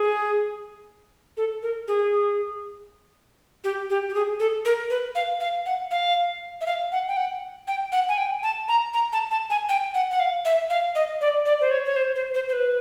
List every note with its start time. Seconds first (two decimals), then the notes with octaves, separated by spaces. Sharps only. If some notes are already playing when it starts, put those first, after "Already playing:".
Already playing: G#4
1.37 A4
1.63 A#4
1.88 G#4
3.64 G4
3.90 G4
4.09 G4
4.15 G#4
4.40 A4
4.65 A#4
4.90 B4
5.15 F5
5.40 F5
5.66 F#5
5.91 F5
6.61 E5
6.66 F5
6.92 F#5
7.08 G5
7.17 F#5
7.68 G5
7.92 F#5
8.09 G#5
8.18 G5
8.43 A5
8.68 A#5
8.94 A#5
9.13 A5
9.31 A5
9.50 G#5
9.69 G5
9.94 F#5
10.11 F#5
10.20 F5
10.45 E5
10.70 F5
10.95 D#5
11.21 D5
11.46 D5
11.61 C5
11.71 C#5
11.85 C#5
11.96 C5
12.16 C5
12.34 C5
12.49 C5
12.53 B4